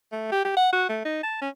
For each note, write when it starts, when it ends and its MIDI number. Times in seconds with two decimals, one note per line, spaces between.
0.12 0.30 57
0.32 0.44 67
0.45 0.53 67
0.57 0.71 78
0.73 0.86 66
0.89 1.01 57
1.05 1.22 63
1.23 1.41 81
1.42 1.49 61